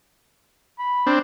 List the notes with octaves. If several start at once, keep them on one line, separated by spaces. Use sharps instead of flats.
B5
C4 D4